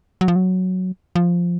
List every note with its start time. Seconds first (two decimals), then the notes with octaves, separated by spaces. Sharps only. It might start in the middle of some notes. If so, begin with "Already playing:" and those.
0.21 F#3
0.28 F3
0.36 F#3
1.16 F3